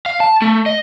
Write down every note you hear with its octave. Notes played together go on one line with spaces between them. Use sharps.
F5
A5
A3
D#5